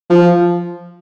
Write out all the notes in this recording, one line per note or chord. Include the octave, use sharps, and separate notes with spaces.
F3